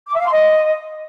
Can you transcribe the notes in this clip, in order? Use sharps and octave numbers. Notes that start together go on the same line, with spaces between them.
D6
E5
F5
C6
D#5